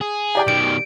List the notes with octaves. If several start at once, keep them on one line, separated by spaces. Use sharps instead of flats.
G#4
G4 D5 G5
B2 D#3 D7